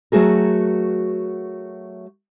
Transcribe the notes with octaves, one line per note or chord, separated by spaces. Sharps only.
F#3 A3 F#4 G#4 A#4